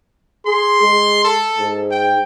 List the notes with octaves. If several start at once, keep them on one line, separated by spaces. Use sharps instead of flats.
G#4 C6
G#3
A4
G#2
G5